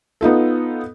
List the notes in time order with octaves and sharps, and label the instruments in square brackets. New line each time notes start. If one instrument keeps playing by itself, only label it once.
[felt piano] B3 D#4 F4 A4